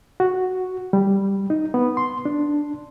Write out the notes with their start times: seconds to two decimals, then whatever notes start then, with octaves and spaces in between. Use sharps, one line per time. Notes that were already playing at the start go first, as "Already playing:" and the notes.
0.20 F#4
0.93 G3
1.50 D#4
1.74 B3
1.97 C6
2.25 D4